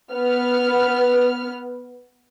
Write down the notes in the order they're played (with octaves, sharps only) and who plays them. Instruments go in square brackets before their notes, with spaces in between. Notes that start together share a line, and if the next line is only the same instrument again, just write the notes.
[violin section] B3 B4 F6